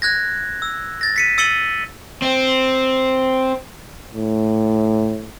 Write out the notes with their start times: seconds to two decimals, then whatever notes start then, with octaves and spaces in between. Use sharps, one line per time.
0.02 F#6 G#6 A#6
0.62 E6
1.01 A6 A#6
1.16 B6 C#7 D#7
1.38 E6 A6 C#7 D#7 F#7 G7
2.22 C4
4.14 A2